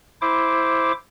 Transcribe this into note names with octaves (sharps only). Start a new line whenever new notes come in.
E4 C5 D6